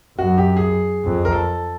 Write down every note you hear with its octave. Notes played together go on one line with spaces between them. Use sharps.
F#2 F#4
G4
G#4
F2
A#4
A4